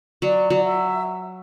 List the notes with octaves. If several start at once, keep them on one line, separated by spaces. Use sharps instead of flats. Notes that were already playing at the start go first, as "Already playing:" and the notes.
F#3 D5
F#3
E5